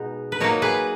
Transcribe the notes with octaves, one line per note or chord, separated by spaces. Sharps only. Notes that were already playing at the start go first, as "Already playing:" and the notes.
Already playing: B2 G#3 B3 D#4
B4
F#3 A#3 D#4 A#4 C#5
G#4 B4